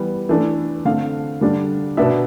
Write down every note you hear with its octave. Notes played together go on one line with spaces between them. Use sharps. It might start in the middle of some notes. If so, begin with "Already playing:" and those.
Already playing: E3 G3 B3
E3 A3 D4
D3 A3 C4 F5
D3 G3 D4
B2 B3 D4 E5